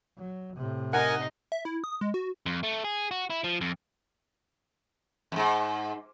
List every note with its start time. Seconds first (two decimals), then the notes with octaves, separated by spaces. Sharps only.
0.17 F#3
0.56 A2 C3
0.93 D#4 A#4 D#5 F#5 G#5
1.52 E5
1.65 E4
1.84 D#6
2.01 G#3
2.14 F#4
2.46 F2
2.63 A3
2.84 G#4
3.11 F#4
3.30 E4
3.44 F3
3.61 F2
5.32 F2 G#2